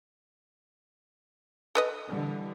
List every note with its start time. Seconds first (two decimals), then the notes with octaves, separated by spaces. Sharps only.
1.75 A4 B4 D#5
2.08 D3 E3 G3